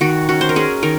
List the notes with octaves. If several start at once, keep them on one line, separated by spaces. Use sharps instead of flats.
D#3 F#4
C#4 F#4
C5
A#4
C#4 G#4
D#3 A#4